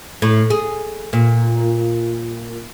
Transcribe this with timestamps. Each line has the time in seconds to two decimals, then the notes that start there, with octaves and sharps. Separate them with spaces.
0.22 A2
0.50 G#4
1.13 A#2